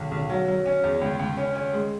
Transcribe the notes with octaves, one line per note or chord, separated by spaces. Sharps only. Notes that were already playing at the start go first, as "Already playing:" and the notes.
Already playing: B1
B1
F#3
F#3
C#4
E2
C#2
C#2
C#4
C#4
G#3